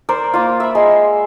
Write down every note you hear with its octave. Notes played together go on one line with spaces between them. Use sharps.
A#4 C5 D5
A#3 F4
E5 B5
G#3 C6